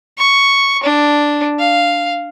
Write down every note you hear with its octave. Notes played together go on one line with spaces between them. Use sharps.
C#6
D4
F5